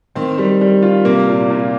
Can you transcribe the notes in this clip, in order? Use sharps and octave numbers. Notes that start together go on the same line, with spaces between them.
D#3 C4
G3
G3
F4
C3 A#3
A#2
A#2